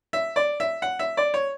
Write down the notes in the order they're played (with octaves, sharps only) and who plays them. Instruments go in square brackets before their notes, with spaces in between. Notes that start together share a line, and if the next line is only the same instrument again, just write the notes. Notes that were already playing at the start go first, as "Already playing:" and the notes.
[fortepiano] E5
D5
E5
F#5
E5
D5
C#5